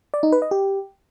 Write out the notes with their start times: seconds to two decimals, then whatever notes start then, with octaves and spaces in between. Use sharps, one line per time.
0.14 D5
0.23 D#4
0.32 B4
0.42 D#5
0.51 G4